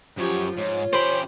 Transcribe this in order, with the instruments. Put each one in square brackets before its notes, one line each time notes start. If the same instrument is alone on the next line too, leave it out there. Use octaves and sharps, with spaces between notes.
[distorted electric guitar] F#2 C#5 [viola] F3 G4
[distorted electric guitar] G#2 [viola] F4 [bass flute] C#5
[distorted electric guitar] C#4 G4 [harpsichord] C5 B5